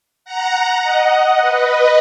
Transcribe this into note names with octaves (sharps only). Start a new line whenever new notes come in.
F#5 A#5
D#5 F#5
B4 D#5